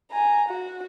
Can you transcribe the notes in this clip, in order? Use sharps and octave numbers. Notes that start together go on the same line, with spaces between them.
G#5 A#5
F#4